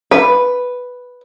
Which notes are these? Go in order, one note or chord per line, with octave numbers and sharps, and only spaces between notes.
B4